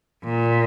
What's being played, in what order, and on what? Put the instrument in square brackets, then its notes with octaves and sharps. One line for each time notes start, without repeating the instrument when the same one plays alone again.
[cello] A#2